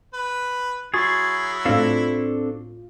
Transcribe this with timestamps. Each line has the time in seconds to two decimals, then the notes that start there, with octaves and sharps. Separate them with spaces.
0.14 B4
0.94 F#3 E4 F#4 G#4 C6 C#6 A6
1.65 A2 C4 D4 F4 A4